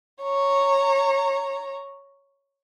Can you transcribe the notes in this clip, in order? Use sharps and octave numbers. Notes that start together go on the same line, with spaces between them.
C#5 A#5